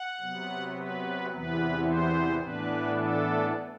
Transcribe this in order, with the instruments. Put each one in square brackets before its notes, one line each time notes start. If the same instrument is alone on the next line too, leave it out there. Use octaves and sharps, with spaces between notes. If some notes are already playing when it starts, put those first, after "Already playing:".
Already playing: [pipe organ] F#5
C3 F#3 B3
B4
E2 C3 E3 B3 B4
C5
A2 E3 B3 D4 B4
A4